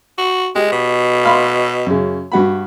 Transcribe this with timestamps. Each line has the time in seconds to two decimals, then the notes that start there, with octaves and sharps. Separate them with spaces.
0.18 F#4
0.55 G#3 G4
0.72 B2
1.25 F5 B5 C6
1.86 F#2 C#3
2.32 G2 F#4 B5